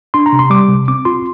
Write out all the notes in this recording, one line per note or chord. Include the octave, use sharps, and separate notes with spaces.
D4 C6
A#5
C3
C6
G3 D6
C3
C4 D6
F4 C6